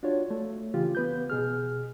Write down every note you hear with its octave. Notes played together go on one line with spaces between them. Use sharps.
D4 F4 F#4 C#5
A3
C#3 E3 F4 G4
B3 B4 G6
B2 G#4 F6